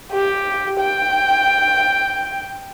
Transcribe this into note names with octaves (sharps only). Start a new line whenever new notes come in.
G4
G5